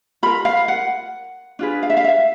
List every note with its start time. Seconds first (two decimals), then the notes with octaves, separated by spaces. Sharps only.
0.23 F4 A#4 B5
0.45 F5
0.68 F#5
1.59 D4 F4 G#4 B4
1.83 F5
1.90 E5
1.97 F5
2.04 E5